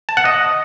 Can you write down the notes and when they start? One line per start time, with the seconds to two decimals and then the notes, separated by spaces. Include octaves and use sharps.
0.09 A5
0.17 F#5
0.25 D#5